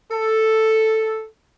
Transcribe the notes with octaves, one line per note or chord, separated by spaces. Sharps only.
A4